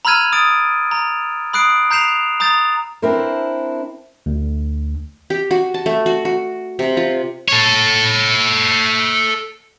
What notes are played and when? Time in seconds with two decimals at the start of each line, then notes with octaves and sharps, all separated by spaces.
0.05 A#5 B5 E6 F6 G#6 D#7
0.32 D#6 A6 D7
0.91 A#5
1.53 B5 D#6 F#6 C7 D7
1.91 A#5 G6 C7 E7 F7
2.40 A#5 D#6 G6 A6
3.02 C4 D4 E4 A#4 C5
4.26 D2
5.30 G4
5.51 F#4
5.74 A5
5.86 A3
6.06 F#4
6.25 F#4
6.79 C3
6.97 F4
7.48 A4 C#5